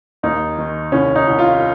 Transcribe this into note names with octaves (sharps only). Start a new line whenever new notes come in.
D#2 D#4
D#3
C2 C#4
D#4
C2
F4